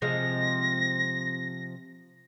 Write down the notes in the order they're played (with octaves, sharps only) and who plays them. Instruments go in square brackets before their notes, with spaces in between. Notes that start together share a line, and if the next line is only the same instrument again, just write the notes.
[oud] C3 F3 G#3 [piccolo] A#6